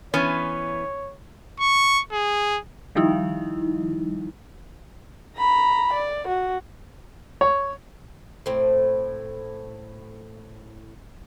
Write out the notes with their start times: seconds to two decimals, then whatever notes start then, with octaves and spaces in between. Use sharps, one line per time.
0.14 E3 B3 C#4 C#5
1.61 C#6
2.13 G#4
2.95 D#3 F3 G3 D#4 E4
5.38 A#5 B5
5.94 D5
6.28 F#4
7.41 C#5
8.46 A2 C4